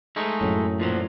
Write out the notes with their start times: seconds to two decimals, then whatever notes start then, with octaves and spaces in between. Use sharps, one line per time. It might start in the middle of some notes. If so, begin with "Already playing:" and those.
0.16 G#3 A3 D#4
0.41 F#2 A2
0.80 A#2 F3 F#3